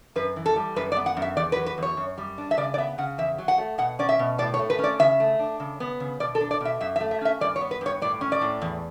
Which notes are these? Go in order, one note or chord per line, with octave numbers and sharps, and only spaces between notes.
F#2 B4
E3
A4
G3
F#2 B4
D5
B3
F#5
F#2
E5
E2 D5
B4
F#3
B4
E2 C#5
F#2
G3
D4
E5
C#3 D5
D5
B3 E5
C#3 F#5
E2 E5
F#3
F#5
A3
B2 F#5
C#4 D5
E5
B2
A2 D5
C#5
A3
B4
C#4
D5
C#3 E5
A3
D4
C#3
B3
C#3
B2 D5
A4
D4
D5
B2 E5
F#2 E5
E5
A3
E5
C#4 E5
G2 D5
C#5
B3
B4
G2 C#5
A2 D5
C#4
D5
A2
E2